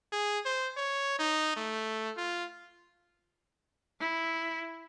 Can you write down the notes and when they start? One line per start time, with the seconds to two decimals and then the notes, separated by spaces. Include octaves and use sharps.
0.12 G#4
0.45 C5
0.77 C#5
1.19 D#4
1.56 A3
2.17 F4
4.00 E4